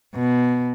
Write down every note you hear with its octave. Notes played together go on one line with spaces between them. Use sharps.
B2